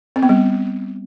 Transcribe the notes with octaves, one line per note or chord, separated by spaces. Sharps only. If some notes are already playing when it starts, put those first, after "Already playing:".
C4
B3
G3